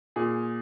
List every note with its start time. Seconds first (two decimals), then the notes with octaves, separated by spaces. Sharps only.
0.16 A#2 G#4